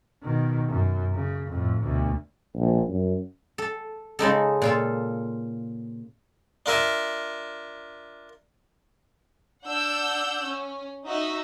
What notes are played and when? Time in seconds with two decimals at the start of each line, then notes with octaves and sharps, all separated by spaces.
0.23 B2 D#3
0.68 F#2
1.14 C#3
1.48 F2 A2
1.81 D2 B2
2.55 A#1
2.89 F#2
3.58 A4
4.19 C#3 G#3 D#4 A4
4.62 A#2 F4 A4
6.66 D4 F4 A#4 E5 G#5
9.65 D4 F#5 E6 G6
10.46 C#4
11.07 D#4 F#4 D#5 E5